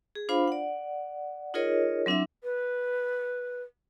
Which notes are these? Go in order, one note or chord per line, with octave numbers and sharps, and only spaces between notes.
G#4
D4 F4 C5 F5 B5
D5 F#5
D#4 F4 G#4 A#4 C#5 D#5
F#3 C4 D4 E4 E5
B4